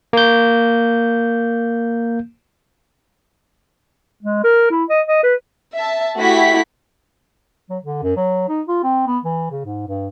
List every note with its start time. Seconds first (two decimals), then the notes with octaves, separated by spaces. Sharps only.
0.13 A#3 G6
4.23 G#3
4.44 A#4
4.71 E4
4.89 D#5
5.08 D#5
5.23 B4
5.75 E5 A5
6.17 A3 E4 F#4 G4 B6
7.70 F#3
7.83 D3
8.03 F#2
8.17 F#3
8.49 D#4
8.68 F4
8.83 C4
9.07 B3
9.24 E3
9.51 C#3
9.64 G#2
9.87 G2